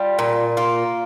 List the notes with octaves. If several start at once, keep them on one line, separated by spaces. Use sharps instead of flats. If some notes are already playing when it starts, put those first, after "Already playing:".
Already playing: G3 F4
A#2
A#3 F4